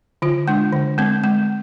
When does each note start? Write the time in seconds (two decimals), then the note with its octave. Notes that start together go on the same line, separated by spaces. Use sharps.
0.22 D3 F4
0.48 G#3 D4
0.73 D3
0.98 G#3 C4
1.24 G#3